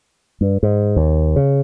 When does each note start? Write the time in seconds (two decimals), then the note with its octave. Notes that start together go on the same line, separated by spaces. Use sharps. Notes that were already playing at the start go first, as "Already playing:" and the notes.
0.41 G2
0.63 G#2
0.96 D#2
1.36 C#3